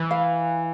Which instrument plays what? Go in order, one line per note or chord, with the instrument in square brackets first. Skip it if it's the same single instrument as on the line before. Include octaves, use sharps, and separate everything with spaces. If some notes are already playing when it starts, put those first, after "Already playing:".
Already playing: [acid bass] E3 [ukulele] B4
[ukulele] F5